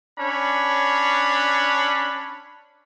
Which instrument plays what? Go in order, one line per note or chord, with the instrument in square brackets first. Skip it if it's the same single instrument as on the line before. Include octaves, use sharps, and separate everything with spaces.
[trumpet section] C#4 D4 C#5 B5